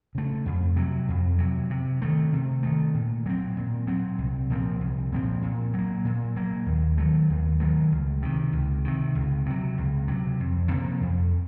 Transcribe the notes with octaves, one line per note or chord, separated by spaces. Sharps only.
C#3 A3
F2
C3 F#3
F2
C3 F#3
C3
D#3 A3
C3
D#3 A3
A#2
F#3 C4
A#2
F#3 C4
C2
A#2 F3 C4
C2
A#2 F3 C4
A#2
F#3
A#3
A#2
F#3 A#3
D#2
D#3 F#3 A3
D#2
D#3 F#3 A3
C#2
C3 D#3
C#2
C3 D#3
C#2
C3 F#3
C#2
C3 F#3
F2
C3 F3 A#3
F2